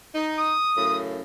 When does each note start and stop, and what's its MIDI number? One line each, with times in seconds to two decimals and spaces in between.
0.14 0.54 63
0.38 0.96 87
0.77 1.23 42
0.77 1.23 45
0.77 1.23 49